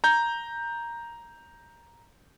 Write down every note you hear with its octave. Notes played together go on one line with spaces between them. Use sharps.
A#5 G6